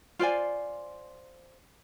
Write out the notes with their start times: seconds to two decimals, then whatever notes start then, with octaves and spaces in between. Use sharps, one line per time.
0.19 F4 C5 D5 G#5